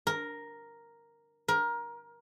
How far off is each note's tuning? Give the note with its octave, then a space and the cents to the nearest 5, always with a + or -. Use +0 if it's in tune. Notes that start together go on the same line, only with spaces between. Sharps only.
A#4 +0
A#4 +20